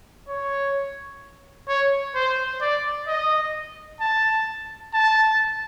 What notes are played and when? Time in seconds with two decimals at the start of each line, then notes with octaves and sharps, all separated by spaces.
0.28 C#5
1.69 C#5
2.15 C5
2.61 D5
3.07 D#5
4.01 A5
4.94 A5